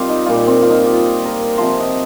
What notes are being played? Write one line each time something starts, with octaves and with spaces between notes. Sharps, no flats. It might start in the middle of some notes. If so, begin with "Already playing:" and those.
Already playing: C3 D#3 G3 C4 F4 G4 D#5
D#4
A#2 G3 F4
C4
F4
D#4
G4
F4
A#4
C3 F3 C5
D#5